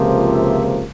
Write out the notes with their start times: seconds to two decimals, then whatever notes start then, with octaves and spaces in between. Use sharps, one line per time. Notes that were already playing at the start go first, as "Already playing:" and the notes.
Already playing: C#2 C3 F3 A#3
0.32 E5